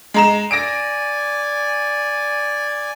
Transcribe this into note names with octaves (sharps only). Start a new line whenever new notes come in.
G#3 A#5 E7
D5 G#5 A#6 D7